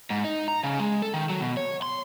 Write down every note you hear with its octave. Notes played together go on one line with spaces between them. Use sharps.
G#2
D#4
A#5
C#3
G#3
A4
D#3
F#3
B2
C#5
C6